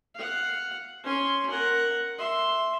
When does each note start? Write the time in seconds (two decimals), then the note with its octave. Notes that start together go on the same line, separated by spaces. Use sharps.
0.15 F5 F#5
1.04 C#4 C6
1.50 A#4 F#5
2.19 E5 C6